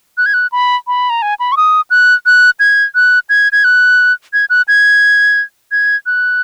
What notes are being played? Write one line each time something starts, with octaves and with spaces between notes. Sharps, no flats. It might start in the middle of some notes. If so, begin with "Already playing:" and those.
F#6
G#6
F#6
B5
B5
A#5
G#5
B5
C#6
D#6
F#6
F#6
G#6
F#6
G#6
G#6
F#6
G#6
F#6
G#6
G#6
F#6